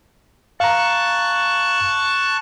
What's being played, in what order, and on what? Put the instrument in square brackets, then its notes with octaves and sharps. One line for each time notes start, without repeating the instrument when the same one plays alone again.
[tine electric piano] F5 A#5 [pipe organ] A5 C#6 F#6